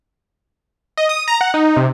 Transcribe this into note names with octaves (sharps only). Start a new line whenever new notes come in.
D#5
D#6
A#5
F#5
D#4
C3